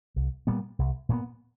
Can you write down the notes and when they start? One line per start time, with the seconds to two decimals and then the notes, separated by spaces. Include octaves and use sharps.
0.16 C2
0.47 A#2 G3 B3
0.79 C2
1.09 A#2 G3 B3